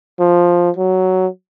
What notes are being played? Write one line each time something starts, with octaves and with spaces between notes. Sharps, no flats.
F3
F#3